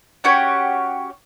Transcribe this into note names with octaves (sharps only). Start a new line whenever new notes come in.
C#4 F#4 G4 C#5